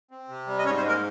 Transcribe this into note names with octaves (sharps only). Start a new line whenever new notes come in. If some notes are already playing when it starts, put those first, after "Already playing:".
C4
C3
G3
D#5
G#2 C#4 C#5
C4 C5
G#3
A#3 A#4